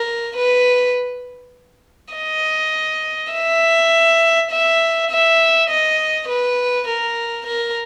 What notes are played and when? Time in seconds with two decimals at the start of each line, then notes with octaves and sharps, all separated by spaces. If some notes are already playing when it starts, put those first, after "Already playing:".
Already playing: A#4
0.37 B4
2.14 D#5
3.33 E5
4.51 E5
5.10 E5
5.70 D#5
6.29 B4
6.88 A#4
7.47 A#4